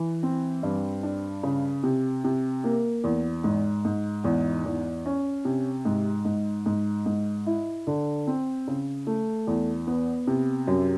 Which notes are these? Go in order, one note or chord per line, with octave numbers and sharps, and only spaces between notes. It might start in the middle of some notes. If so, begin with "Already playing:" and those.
Already playing: E3
C4
G2
D4
C#3
C3
C3
A#3
E2
G#2
G#2
E2
E2
C#4
C3
G#2
G#2
G#2
G#2
E4
D3
C4
C#3
A3
E2
B3
C3
F#2